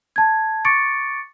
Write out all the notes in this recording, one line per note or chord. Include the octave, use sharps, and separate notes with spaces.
A5 G#6
C#6 D6 A6 C#7 D7